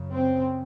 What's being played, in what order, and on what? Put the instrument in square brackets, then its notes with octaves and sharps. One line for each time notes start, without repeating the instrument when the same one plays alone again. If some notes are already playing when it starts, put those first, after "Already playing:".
Already playing: [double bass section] F#2 C#3
C4